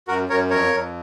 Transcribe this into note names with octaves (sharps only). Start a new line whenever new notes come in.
F#2 F#4 A#4
F#2 A#4 C#5
F2 A#4 C#5
F2